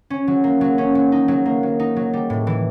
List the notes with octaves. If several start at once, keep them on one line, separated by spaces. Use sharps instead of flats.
C#4
F#3
A#3
F#3
C#4
F#3
D#4
F#3
A#3
F#3
D#4
F#3
G3
A2
E3